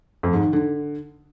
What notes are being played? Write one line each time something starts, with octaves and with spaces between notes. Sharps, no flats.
F2
G#2
D#3
D3